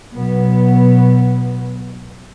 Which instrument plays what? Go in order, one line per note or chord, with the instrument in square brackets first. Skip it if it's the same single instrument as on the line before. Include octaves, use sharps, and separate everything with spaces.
[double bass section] B2 F#3 B3